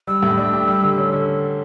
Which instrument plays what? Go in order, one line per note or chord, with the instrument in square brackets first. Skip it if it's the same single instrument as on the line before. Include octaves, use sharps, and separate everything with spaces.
[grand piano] G3 [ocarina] E6
[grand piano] A2
D4
G4
G3
D3
C#4
D3